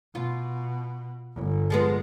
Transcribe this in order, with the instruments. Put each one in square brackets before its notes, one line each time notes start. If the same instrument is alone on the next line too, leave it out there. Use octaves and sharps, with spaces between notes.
[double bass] B2 [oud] F4
[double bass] G1
[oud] F3 G#3 B3